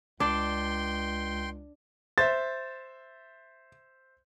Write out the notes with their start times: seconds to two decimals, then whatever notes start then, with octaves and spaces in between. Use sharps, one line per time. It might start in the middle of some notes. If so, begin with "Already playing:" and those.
0.20 C#2 D4 G5 C6
2.18 C5 E5 A6